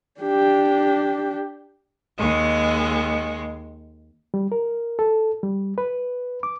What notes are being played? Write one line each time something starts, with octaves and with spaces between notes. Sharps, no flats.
D4 G4
D#2 G#3
G3
A#4
A4
G3
B4
D6